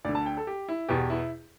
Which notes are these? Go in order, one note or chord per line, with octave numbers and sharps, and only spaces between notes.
D2 D3 D5
A5
G5
A4
G4
E4
E2 B2 G4
E4